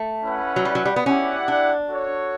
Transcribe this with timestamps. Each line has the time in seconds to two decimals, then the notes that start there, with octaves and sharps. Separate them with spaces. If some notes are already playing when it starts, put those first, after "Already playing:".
Already playing: A3
0.23 C#4 E4 B4 F#5
0.56 F#3
0.65 G3
0.75 F#3
0.86 G3
0.96 B3
1.06 C#4 E4 G4 D5 F#5
1.48 D4
1.89 F#4 A4 C#5